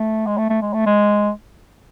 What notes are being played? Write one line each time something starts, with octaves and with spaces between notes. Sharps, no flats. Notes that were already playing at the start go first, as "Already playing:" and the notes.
Already playing: A3
G#3
A3
A3
G#3
A3
G#3